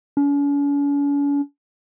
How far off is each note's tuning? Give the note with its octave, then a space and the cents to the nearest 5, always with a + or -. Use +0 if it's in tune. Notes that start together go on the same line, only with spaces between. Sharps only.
C#4 +45